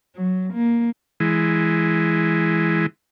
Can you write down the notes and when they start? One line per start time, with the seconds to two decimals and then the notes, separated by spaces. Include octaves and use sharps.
0.16 F#3
0.53 A#3
1.20 E3 G#3